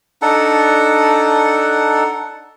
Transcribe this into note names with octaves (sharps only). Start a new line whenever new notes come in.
D4 D#4 A4 F#5